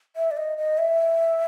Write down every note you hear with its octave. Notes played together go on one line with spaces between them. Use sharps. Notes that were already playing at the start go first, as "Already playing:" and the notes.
E5
D5
D#5
D#5
E5